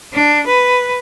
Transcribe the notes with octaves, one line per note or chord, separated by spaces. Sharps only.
D4
B4